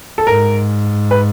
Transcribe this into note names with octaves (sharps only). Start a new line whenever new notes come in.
A4
G#2 A#4
B4